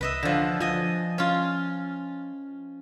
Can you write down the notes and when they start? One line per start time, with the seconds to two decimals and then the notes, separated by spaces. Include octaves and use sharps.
0.01 C2 B4 D#5 E5
0.23 D3 F3
0.60 F3 D#5 G#5
1.18 C#4 F4